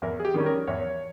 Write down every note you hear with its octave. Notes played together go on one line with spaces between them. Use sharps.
E2 A#4
G#4
G4
D#3 G3 C#4
A#4
E2 C#5